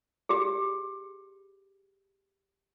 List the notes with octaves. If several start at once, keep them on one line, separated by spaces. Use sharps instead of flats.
G4 G#4